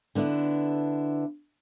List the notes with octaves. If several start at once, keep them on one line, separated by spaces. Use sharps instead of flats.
D3 B3 D4 E4